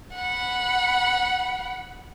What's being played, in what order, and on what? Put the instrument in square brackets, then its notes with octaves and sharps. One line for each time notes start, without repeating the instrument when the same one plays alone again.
[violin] F#5 B5